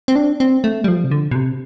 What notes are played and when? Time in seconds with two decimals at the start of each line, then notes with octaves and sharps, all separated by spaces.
0.08 C4
0.16 D4
0.40 C4
0.64 A3
0.84 G3
0.88 F3
1.04 C3
1.11 D3
1.31 B2
1.35 C3